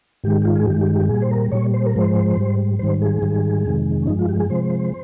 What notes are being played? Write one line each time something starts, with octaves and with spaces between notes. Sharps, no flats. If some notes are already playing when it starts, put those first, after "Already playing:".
G#2 D#3 G#3 G4
G4
F4
G#4
G2 D#3 G#3 G4
G4
G4
A#2 G3 G#4
C5
A#4
A#2 G3 C#5
C5
A#4
G#2 F3 G#3 C5
G#2 G3
G#2 D#3 G3 C5
G#4
G#2 D#3 G3
F2 C3 D#3 G#3
C#4
G2 F3 G#3 D#4
F4
G4
G#4
C3 F3 G#3 C5